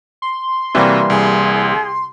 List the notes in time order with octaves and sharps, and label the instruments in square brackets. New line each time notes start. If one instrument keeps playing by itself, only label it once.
[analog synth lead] C6
[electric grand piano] C3 [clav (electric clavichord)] E3 G3 A#3 [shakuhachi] F#4
[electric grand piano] C2 [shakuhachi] G#4